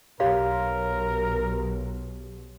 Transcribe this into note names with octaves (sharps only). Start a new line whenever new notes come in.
B1 G4 A#4 C#5 F5 C6